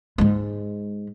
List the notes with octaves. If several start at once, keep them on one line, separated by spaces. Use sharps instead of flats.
G#2 G#3